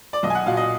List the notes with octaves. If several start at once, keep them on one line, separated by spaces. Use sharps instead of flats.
D5
B1 D#5
G#5
F#5
A#2 F#3 F5
D#5